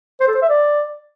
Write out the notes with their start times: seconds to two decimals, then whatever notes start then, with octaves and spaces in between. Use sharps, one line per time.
0.20 C5
0.28 A4
0.35 C5
0.42 E5
0.49 D5